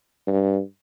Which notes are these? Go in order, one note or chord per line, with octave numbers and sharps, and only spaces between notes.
G2